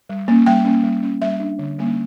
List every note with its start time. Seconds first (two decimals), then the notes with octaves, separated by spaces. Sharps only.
0.09 G3
0.28 A#3 C#4
0.46 G3 G5
0.65 A#3 C#4
0.84 G3
1.03 C#4
1.22 G3 E5
1.40 D4
1.59 D3
1.78 G3 A#3 C#4